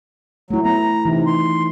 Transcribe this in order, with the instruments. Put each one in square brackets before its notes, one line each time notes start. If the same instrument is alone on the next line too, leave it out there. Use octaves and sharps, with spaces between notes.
[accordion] F#3 [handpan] A3 E4
[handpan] B3 [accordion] A#5
[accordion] C3 [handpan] E3 D#4
[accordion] C6